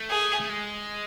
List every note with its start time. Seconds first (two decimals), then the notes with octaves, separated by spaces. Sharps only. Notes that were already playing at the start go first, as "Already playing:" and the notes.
Already playing: A3
0.10 G#4
0.40 A3
0.49 G#3